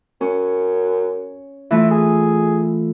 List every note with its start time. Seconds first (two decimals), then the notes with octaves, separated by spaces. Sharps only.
0.21 F#2 C#4
1.71 E3 A3 E4 F4
1.91 G#4